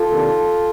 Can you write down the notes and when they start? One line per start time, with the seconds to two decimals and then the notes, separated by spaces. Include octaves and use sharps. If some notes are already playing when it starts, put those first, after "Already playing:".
Already playing: F4 A4
0.09 C3 D#3 A#3 D4